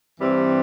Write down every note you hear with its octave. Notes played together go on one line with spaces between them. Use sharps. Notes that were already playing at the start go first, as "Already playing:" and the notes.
G2 E3 G3 C4